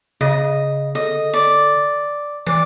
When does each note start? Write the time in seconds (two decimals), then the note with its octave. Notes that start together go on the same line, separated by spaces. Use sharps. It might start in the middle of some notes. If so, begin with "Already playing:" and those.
0.21 C#3 D#5
0.95 D3 D#5
1.34 D5
2.46 E3 D5